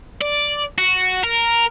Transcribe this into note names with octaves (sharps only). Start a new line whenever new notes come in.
D5
F#4
A#4